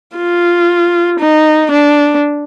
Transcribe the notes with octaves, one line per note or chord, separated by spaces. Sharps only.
F4
D#4
D4